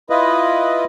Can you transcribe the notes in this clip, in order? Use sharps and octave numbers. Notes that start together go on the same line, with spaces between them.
E4 F4 B4 D#5